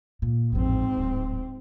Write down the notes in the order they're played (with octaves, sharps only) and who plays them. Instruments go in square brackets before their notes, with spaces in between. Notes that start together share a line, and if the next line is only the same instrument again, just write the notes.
[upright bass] A#2
[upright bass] A1 F2 [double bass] G#2 C4
[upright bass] D1